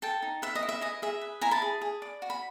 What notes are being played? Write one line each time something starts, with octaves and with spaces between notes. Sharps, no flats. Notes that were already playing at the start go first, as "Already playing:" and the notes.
A4 G5 A5
D#4
B4 E5
D#5
E4
E5
G#4 D#5
G#4 E5
B4
E4 G#5 A#5
A5 B5
G#4
G#4
D5
F#4
B5